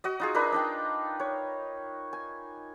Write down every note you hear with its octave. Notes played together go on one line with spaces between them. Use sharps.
F#4 D#5
D#4 F4 G#4
D4 D#4 A#4 B4
D4 D#4 G5
C#5
G#5